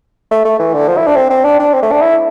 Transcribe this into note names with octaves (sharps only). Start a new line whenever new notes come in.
A3
A3
E3
D3
F3
E4
D4
C4
C4
D4
D4
C4
A3
D4
E4